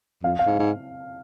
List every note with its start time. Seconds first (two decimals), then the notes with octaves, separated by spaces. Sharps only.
0.23 F2 F5
0.39 F5
0.46 G#2
0.59 G#2